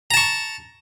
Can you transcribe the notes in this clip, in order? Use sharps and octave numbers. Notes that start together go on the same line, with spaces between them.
A5 A#5 C#6